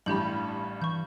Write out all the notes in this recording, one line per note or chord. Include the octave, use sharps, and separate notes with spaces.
A1 G2 G3 G4 B5 G6 F#7
E3 C#6 G6